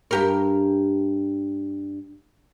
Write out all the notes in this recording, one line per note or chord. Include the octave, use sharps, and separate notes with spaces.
G2 G4 A#4